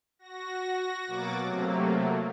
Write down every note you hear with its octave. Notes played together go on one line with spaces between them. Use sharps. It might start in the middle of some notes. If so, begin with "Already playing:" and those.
F#4 A#6
B2 F#3 A#3 F#4 D6 A6
C3 F#3 A3 A#3